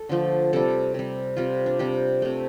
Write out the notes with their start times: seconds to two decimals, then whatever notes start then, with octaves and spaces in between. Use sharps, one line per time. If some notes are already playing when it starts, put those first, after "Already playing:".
Already playing: A4
0.09 D3 F3 A3
0.53 C3 G3 A4
0.94 C3 G3
1.37 C3 G3 F4
1.66 D4
1.79 C3 G3 G4
2.22 C3 A3